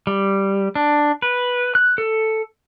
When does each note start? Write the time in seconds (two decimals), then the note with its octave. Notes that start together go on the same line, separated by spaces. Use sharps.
0.07 G3
0.75 D4
1.22 B4
1.75 F#6
1.98 A4